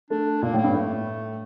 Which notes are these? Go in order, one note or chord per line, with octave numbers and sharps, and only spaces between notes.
A3 D4
A#2 A#3
A2
A#3
G2
A2 A3